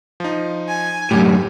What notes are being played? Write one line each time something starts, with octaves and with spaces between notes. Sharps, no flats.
F3 D#4
G#5
F#2 A2 G4